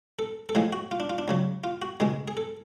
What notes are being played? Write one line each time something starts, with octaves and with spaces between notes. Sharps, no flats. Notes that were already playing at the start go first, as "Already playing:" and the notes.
A4
A4
A2 F3 G#3 G#4
F#4
F4
D4
F4
D4
C#2 C#3 F#3
F4
F#4
C#2 B2 G#3 G#4
G#4
A4